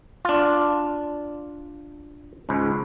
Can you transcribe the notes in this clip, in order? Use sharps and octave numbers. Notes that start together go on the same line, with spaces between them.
D4 F4
C#2 G#2